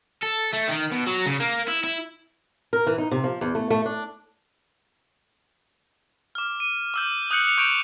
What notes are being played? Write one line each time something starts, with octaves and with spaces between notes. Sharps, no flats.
A4
A3
D#3
B2
F#3
C#3
A#3
E4
E4
A#4
E3
D#4
C3
F3
E2
A3
A3
D4
D6 F6
D#7
D6 E6 G6
D#6 F#6 G6 C#7 F#7
D#6 C#7 F7
C#6 G6 D7 E7 F7